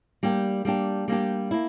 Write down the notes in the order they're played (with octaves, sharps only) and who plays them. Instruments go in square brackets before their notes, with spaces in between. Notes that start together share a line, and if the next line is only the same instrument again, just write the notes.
[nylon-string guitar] G3 A#3 D4 G4
G3 A#3 D4 G4
G3 A#3 D4 G4
A#3 E4